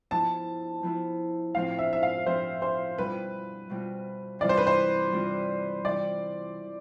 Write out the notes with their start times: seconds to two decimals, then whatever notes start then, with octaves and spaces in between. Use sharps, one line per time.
0.11 F3 B3 E4 A5
0.83 F3 B3 E4
1.55 A2 F3 C4 F5
1.79 E5
1.93 E5
2.03 F5
2.26 A2 F3 C4 C5
2.62 C5
2.98 B2 G3 C4 F4 B4
3.70 B2 G3 C4 F4
4.39 C3 E3 G3 C4 F4 D5
4.49 C5
4.58 B4
4.67 C5
5.12 C3 E3 G3 C4 F4
5.84 C3 E3 G3 D5